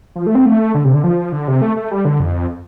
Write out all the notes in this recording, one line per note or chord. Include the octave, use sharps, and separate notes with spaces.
F3
A3
C4
A3
D3
C3
D3
F3
D3
C3
A3
A3
G3
D3
F2